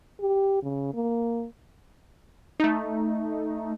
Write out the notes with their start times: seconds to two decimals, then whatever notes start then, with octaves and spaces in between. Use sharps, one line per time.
0.20 G4
0.63 C#3
0.94 A#3
2.60 A3 D#4